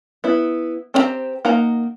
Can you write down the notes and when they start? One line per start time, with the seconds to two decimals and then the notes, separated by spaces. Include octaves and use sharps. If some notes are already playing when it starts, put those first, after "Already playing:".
0.24 B3 E4
0.94 C4 D4 G4 C5 A#5
1.45 A#3 D#4 F#5 A#5